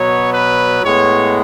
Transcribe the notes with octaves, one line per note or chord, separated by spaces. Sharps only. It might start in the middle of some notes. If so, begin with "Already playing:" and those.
Already playing: B2 F#3 B3 C#5
B4
A2 G#3 B3 C#5